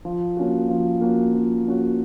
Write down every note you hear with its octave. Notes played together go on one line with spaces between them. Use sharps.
F3
A#3 C#4 F#4
F3
A#3 C#4 F#4
F3
A#3 C#4 F#4